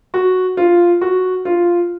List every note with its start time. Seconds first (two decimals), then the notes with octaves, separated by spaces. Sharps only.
0.14 F#4
0.57 F4
1.01 F#4
1.45 F4